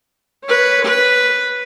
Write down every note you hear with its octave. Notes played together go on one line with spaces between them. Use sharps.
B4 C#5
B4